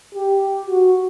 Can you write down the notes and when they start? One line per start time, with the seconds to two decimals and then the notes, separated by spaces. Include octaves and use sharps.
0.15 G4
0.66 F#4